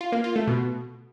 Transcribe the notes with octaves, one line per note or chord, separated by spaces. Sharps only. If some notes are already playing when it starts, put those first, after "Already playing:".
F4
A#3
F4
A3
B2